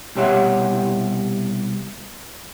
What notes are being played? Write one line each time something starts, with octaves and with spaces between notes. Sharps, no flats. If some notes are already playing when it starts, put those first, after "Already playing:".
C2 B2 G4 C#5 E5 F#5